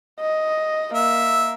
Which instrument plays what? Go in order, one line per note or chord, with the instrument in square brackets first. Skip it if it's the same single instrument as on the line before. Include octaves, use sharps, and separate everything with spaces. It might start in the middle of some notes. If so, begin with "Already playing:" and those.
[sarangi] D#5
[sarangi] A#3 [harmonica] E5